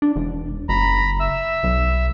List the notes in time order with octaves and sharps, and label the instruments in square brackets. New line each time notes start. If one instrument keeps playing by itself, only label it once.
[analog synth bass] D4
E1
[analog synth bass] F#1 [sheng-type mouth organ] A#5 B5
[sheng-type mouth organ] E5 E6
[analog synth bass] B1